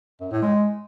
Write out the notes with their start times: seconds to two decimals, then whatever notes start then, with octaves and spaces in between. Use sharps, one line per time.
0.21 F#2
0.31 A2
0.42 G#3